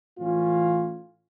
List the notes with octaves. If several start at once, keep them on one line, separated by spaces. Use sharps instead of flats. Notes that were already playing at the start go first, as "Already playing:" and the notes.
A2 E3 C#4 F4